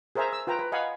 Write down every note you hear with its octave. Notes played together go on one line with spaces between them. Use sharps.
G#4 A#4 C5 E5 G#5 A#5
E6
F4 B4 G5 A#5
B4
D#5 F5 F#5 G#5 B5